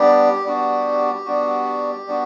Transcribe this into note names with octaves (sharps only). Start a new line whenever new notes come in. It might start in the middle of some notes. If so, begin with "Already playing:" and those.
Already playing: G3 B3 D4 G4
G3 B3 D4 F#4
G3 B3 D4 F#4
G3 B3 D4 F#4